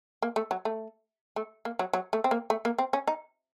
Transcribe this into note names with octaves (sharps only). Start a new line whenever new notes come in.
A#3
A3
F#3
A3
A3
A#3
F#3
F#3
A3
C4
A#3
A3
A#3
C4
C#4
D#4